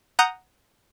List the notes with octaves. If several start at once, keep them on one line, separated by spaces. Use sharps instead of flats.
F#5 A#5 D#6 F#6 G6